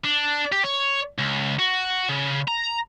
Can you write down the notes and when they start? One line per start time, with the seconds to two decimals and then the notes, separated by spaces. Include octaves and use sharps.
0.05 D4
0.52 G4
0.64 C#5
1.18 C#2
1.59 F#4
2.09 C#3
2.48 A#5